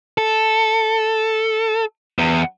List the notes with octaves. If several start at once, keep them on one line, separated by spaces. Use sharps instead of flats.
A4
E2